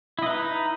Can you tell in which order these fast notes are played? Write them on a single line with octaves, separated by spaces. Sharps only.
E4 D#5 B4 D#4